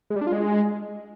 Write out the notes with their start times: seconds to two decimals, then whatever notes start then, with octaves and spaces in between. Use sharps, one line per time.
0.10 G#3
0.16 G3
0.21 D4
0.27 F4
0.32 G#3